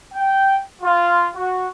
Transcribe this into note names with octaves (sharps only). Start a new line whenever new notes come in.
G5
F4
F#4